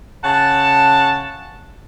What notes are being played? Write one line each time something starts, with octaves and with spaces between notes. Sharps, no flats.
C#3 F#5 A5